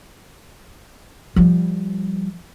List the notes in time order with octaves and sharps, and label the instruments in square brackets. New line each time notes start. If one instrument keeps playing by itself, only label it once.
[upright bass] F3 G3